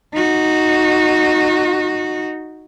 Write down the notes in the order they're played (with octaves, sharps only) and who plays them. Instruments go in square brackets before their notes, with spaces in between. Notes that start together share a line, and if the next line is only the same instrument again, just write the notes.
[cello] D#4 F#4